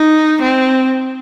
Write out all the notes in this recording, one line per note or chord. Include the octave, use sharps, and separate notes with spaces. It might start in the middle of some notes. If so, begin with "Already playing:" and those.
Already playing: D#4
C4